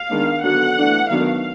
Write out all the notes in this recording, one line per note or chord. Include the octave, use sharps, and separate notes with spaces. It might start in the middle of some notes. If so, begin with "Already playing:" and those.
Already playing: F5
D#3 G#3 B3 D4
D3 F#3 B3 D4 F#5
E3 A3 D4
D#3 F#3 B3 D4 F5